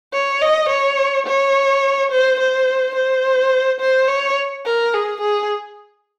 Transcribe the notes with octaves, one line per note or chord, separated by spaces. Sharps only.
C#5
D#5
C#5
C#5
C5
C5
C5
C5
C#5
A#4
G#4
G#4